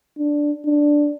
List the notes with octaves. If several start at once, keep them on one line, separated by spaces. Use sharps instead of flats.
D4
D4